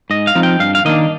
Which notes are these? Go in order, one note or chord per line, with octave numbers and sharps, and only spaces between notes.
G#2 D#5
F5
F3 C4 D#4
G5
G2 F5
F5
D#3 A#3 D4 D#5